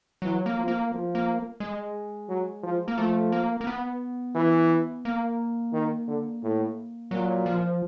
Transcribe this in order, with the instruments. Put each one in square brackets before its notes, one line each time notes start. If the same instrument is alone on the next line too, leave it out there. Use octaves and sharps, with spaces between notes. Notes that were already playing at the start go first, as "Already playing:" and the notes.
[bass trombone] E3 [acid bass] F#3
[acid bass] A#3
[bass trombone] F3
[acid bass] A#3
[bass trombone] F3
[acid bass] A#3
G#3
[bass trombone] F#3
F3
[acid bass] A#3
[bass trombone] F3 [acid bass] A3
[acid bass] A#3
A#3
B3
[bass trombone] E3
[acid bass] A#3
[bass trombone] D#3
D3
A2
[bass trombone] A#2 [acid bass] F#3
[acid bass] F3